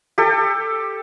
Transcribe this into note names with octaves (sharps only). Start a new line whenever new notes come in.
G4 A4